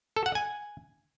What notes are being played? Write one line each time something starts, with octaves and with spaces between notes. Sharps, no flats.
A4
F#5
G#5